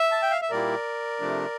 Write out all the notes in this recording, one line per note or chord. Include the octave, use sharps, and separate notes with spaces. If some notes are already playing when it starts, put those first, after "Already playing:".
Already playing: E5
A5
G5
F5
E5
A#2 G3 A#3 E4 A#4 D5
C3 F3 A3 D4